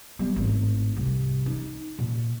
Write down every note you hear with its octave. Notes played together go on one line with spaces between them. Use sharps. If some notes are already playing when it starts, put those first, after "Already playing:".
G3 B3
G#1 A2
C2
D#4
A#2